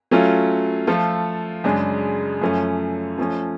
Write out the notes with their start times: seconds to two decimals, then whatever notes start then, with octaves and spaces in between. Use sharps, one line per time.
0.11 F#3 A3 C#4 F4
0.87 F3 A3 F4 A4
1.64 F#2 C#3 G#3 D4
2.42 F#2 F3 A3 C#4
3.18 F3 A3 C#4